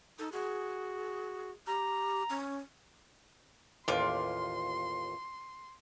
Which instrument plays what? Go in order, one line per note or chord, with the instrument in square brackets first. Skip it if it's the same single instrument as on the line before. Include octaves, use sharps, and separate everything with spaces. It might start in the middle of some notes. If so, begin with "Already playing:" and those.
[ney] D#4 [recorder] A4
[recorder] F#4 [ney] G#4
[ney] G4 [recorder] A#5
[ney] C#4
[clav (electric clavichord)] A1 D#2 [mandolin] F4 D6 [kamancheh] C6